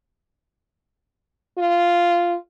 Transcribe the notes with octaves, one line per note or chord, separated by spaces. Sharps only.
F4